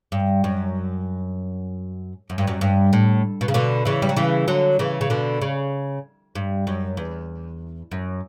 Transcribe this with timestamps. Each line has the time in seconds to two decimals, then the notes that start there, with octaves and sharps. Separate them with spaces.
0.12 G2
0.44 F#2
2.30 F#2
2.38 G2
2.47 F#2
2.61 G2
2.93 A2
3.41 B2
3.48 C#3
3.54 B2 D3
3.85 C#3 E3
4.02 G3
4.09 F#3
4.17 C#3 E3
4.48 D3 F#3
4.79 C#3 E3
5.01 C#3
5.10 B2 D3
5.42 C#3
6.35 G2
6.67 F#2
6.97 E2
7.92 F#2